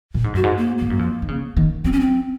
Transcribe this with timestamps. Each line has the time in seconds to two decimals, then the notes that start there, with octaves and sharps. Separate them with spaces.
0.14 A#2
0.24 G#2
0.33 F#2 F#4
0.44 G#2
0.57 A#3
0.78 G#2 A#3
0.90 F#2
0.99 F2
1.22 D#3
1.28 C#3
1.57 D#3
1.84 F#3 C4
1.92 C#4
2.00 C4